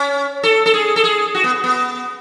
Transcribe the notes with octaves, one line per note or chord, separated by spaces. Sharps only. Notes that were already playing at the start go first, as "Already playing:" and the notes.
Already playing: C#4
A4
A4
G#4
A4
G#4
F#4
B3
B3